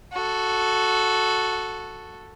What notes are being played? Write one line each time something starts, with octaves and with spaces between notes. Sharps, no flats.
F#4 A4